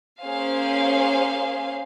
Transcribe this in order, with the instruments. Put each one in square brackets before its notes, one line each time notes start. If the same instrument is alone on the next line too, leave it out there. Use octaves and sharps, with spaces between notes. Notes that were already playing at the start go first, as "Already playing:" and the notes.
[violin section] A#3 C#4 G#4 C5 F5